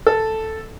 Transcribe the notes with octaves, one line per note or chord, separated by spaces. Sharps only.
A4